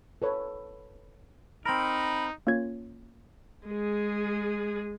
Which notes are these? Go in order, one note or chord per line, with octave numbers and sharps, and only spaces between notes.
A4 B4 C#5
C4 D#4 A#4 B5
A#3 C#4 F4 C#5 G#6
G#3 G#4